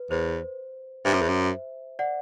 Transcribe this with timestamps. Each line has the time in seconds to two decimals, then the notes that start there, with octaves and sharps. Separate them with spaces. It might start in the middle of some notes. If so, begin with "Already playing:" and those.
Already playing: B4
0.10 E2 C5
1.05 G2 C5 E5
1.14 F#2
1.21 E2
1.29 F#2
1.99 D5 F#5